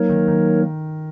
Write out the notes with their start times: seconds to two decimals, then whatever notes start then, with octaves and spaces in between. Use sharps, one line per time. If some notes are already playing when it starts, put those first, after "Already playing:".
Already playing: F#3 A#3 D#4 A#4 C#5
0.09 D#3
0.28 D#3